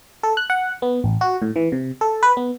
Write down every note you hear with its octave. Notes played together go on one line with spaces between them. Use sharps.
A4
F#6
F#5
B3
A1
F#4
A2
E3
C3
A4
B4
B3